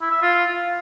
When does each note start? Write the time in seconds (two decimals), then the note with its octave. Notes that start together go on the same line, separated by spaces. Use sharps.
0.01 E4
0.11 E5
0.22 F4